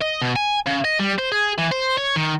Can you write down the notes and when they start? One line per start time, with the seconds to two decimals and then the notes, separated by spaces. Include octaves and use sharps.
0.01 D#5
0.22 B2
0.36 G#5
0.67 C#3
0.84 D#5
0.99 G3
1.18 C5
1.32 G#4
1.59 E3
1.72 C5
1.98 C#5
2.16 D#3